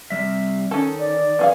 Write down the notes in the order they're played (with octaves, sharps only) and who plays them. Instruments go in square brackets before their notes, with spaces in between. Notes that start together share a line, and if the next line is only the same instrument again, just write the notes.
[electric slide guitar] C3 G3 E5
[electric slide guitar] D#3 [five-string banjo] C#4 A4
[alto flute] D5
[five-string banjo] B3 G#4 F5